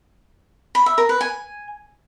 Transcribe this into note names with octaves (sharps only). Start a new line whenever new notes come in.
B5
E5
A#4
B4
G#5